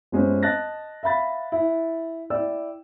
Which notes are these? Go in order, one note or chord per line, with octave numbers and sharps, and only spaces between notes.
G1 G#3 C#4 C5
D#5 A5 F#6 A6 A#6
E5 F5 B5 A6
E4
E4 D5 G5 E6